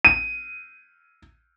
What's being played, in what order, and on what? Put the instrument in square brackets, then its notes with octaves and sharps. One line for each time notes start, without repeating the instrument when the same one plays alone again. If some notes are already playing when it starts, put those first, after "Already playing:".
[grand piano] D#7